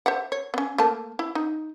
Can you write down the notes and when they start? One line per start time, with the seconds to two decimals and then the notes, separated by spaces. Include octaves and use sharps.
0.06 C5 E5 F#5
0.32 C#5
0.54 B3 C#4
0.78 A3 A#3 A5
1.19 E4
1.35 D#4